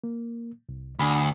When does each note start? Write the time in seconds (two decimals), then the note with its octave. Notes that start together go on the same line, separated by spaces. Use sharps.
0.04 A#3
0.69 C2
0.99 D2 D4 G#5 B5